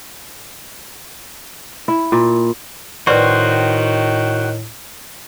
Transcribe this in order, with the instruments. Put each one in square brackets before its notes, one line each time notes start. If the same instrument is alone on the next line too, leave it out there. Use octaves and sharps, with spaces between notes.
[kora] E4
A#2
[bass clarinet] A2 [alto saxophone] D#3 [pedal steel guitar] F#4 C5 [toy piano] B4 D5 C#6